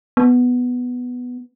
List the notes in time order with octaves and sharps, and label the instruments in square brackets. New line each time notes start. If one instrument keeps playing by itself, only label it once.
[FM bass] B3